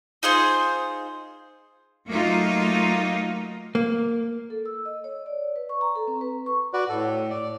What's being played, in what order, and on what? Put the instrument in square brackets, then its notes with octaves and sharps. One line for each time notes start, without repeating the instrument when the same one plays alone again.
[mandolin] D#4 F4 G#4 C5
[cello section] F#3 A3 A#3 D#4 F4
[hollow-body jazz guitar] A#3
[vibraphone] A4
E6
D#5
C#5
D5
B4
C#6
A#5
A4
C4
B4
C#6
[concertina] F#4 B4 D5
[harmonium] A2 [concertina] A4
[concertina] D5